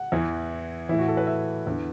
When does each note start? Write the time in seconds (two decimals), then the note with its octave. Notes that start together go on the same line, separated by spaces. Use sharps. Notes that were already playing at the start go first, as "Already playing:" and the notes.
Already playing: F#5
0.12 E2 E3
0.89 E3 E4
0.93 A2
0.99 F#4
1.08 A4
1.17 B4
1.27 E5
1.67 E2 D3